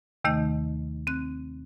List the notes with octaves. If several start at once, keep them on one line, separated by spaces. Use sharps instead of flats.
D#2 C3 D#3 A3 D#4 D#5
C4 F#6